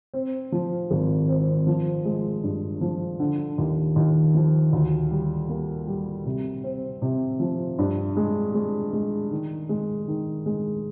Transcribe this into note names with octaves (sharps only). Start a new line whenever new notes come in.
C4
F3
G#1
C4
F3
G#3
G2
F3
D3
D#2
D#2
F3
D2
G3
A#3
G3
C3
C4
C3
F3
G2
G#3
G#3
G#3
D#3
G#3
D#3
G#3